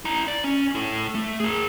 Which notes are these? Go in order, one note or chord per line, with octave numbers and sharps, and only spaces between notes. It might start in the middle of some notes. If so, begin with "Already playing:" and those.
E4 A#5
D5
C#4
E4 A4
A3
G#4 A#4